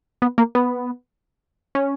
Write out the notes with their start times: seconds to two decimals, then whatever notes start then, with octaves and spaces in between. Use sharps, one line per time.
0.22 B3
0.38 A#3
0.55 B3
1.75 C#4